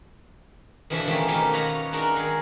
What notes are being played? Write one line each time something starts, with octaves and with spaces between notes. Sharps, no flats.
F2 B2 E3 F3 D4 E5
D#3 E3 G#3 A3 C#4 G4
B2 D#3 F3 A3 A#3
B4 C#5 D#5 F5 F#5 A#5
G#3 D4 D#4 F#4 A#4
D#3 G#4